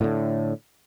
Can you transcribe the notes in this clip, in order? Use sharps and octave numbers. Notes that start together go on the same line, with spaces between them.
A2 D3